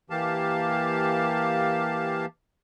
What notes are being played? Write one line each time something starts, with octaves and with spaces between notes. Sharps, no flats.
E3 A#3 G4 F5 A5